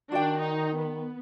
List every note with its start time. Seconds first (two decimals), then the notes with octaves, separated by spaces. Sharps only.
0.12 D#3 D4 F#4 D5 G5
0.41 D#4
0.77 B3